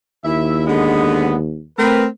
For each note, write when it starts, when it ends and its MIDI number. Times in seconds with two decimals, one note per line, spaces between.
0.24 1.67 39
0.24 0.64 64
0.24 0.64 76
0.67 1.35 50
0.67 1.35 56
0.67 1.35 59
1.78 2.08 57
1.78 2.04 60
1.78 2.04 70
1.78 2.04 71